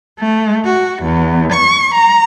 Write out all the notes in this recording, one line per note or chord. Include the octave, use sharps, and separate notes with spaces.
A3
F#4
E2
C#6
A#5